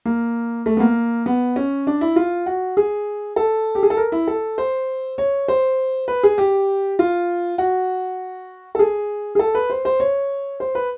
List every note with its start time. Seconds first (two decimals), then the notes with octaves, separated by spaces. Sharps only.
0.05 A#3
0.66 A3
0.77 B3
0.80 A#3
1.26 B3
1.56 C#4
1.87 D4
2.01 E4
2.16 F4
2.46 F#4
2.77 G#4
3.36 A4
3.75 G4
3.83 G#4
3.90 A4
3.97 A#4
4.12 E4
4.28 A4
4.58 C5
5.18 C#5
5.48 C5
6.08 B4
6.23 G#4
6.38 G4
6.99 F4
7.58 F#4
8.75 A4
8.79 G#4
9.35 G#4
9.39 A4
9.55 B4
9.70 C5
9.85 C5
10.00 C#5
10.60 C5
10.75 B4